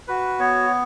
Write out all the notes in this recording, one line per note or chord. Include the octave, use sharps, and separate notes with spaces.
F#4 B4
B3 C#5